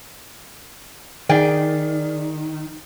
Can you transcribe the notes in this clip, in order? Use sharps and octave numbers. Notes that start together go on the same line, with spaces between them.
D#3 G#4 D5 G5